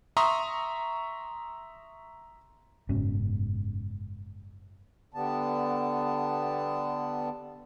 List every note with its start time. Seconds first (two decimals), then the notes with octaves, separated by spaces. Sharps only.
0.17 E5 A#5 C6 C#6 D#6
2.89 F#1 G#2 B2 C#4
5.14 D3 G3 B3 A5